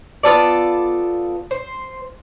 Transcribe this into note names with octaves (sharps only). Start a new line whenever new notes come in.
B3 F4 A4 D5
C5